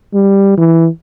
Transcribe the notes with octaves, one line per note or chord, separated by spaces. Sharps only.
G3
E3